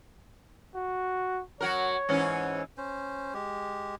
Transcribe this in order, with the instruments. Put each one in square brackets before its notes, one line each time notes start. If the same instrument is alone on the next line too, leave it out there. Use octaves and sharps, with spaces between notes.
[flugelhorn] F#4
[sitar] F#3 F#4 A#4 [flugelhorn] C#5
[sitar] G#2 E3 C#4
[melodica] C#4 C5
G#3 G4